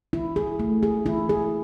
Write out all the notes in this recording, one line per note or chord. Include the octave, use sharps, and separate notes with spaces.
E4
G#4
A3
G#4
E4
G#4